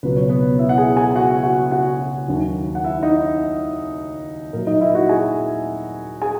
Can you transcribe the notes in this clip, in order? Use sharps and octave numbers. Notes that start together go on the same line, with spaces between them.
C#2 B2 F#3 B4
C#5
B3 B4
E4 E5
F#5
G#4 G#5
G#4 G#5
F#4 F#5
F#4 F#5
F#4 F#5
D#2 D#3 F#3
F#5
E4 E5
D#4 D#5
A#2 F#3 A#4
D#4 D#5
E4 E5
F#4 F#5
G#4 G#5
G#4 G#5